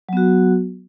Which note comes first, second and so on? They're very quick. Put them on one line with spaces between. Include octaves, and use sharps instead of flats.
F#3 B3 F#4